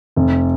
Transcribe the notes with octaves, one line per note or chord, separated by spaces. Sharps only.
F1